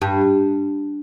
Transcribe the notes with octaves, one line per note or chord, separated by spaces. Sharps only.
G2